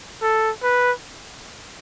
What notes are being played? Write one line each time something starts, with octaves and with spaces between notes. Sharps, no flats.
A4
B4